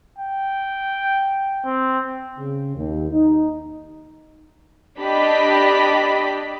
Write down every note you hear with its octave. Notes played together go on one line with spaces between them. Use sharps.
G5
C4
C#3
D#2
D#4
D4 G4 D5 D#5 B5 B6